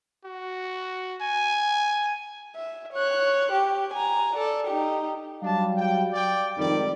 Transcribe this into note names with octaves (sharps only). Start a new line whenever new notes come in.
F#4
G#5
E5
C#5 F#6
G4
G#5 A#5
A4 D5
D#4 G4
F#3 G3 D4 F5 A5
G5
D5 G5
F2 G#2 D#3 G3 D5